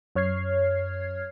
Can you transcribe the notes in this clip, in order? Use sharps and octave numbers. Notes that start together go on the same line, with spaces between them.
F#2 C#5 F6 G#6 C7